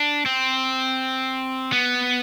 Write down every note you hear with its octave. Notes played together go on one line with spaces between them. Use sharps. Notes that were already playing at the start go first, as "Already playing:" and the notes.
Already playing: D4
C4
B3